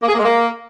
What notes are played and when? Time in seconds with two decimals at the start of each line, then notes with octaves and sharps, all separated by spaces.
0.03 A#3
0.08 G#4
0.14 A#3
0.19 G#3
0.25 A#3